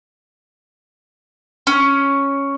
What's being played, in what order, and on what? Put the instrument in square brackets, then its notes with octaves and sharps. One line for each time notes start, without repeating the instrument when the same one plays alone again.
[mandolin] C#4